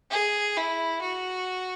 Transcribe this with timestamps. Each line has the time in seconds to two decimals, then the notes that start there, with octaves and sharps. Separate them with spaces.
0.11 G#4
0.57 E4
1.02 F#4